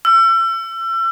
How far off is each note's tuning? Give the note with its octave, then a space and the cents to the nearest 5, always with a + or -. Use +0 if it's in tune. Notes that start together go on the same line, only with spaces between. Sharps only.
E6 +35